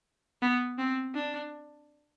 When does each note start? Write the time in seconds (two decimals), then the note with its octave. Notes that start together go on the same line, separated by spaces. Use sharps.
0.42 B3
0.78 C4
1.15 D4